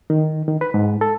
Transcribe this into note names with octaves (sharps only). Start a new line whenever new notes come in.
D#3
D#3
B4
G#2
A4